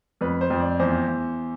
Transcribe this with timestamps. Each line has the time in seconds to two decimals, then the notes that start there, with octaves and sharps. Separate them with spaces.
0.21 F2 B4
0.41 C5
0.50 F2
0.60 D5
0.79 E2 C5
1.08 E2